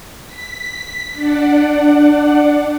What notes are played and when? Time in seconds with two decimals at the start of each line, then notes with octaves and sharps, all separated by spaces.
0.25 B6
1.12 D4 D5 F#5